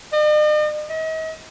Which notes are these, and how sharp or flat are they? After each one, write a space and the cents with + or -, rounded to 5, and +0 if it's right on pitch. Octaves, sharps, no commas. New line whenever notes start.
D#5 -45
D#5 +40